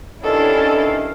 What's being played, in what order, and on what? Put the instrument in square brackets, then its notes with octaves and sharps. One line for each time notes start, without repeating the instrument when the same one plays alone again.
[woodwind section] G2 D#3 F5 [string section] C#4 D4 E4 [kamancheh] A4